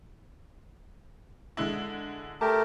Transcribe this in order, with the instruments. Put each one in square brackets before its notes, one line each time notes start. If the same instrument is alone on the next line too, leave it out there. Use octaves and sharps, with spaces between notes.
[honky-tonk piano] D3 G#3 E4
[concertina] A3 G4 A#4 [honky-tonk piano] A5